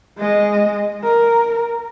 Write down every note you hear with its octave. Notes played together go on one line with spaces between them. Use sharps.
G#3 D#5
A#4